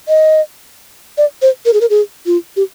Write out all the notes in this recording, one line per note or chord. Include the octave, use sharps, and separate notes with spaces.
D#5
D5
C5
A#4
G#4
A#4
G#4
F4
G4